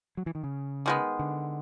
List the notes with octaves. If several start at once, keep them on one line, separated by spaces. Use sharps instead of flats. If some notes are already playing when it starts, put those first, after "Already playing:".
F#3
E3
D#3
C#3
D#3 G#3 B3
D3